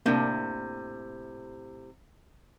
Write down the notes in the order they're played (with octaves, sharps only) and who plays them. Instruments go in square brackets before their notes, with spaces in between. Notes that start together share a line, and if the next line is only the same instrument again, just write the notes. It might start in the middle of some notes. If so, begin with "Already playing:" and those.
[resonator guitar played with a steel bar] A2 C3 [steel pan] A#3 D4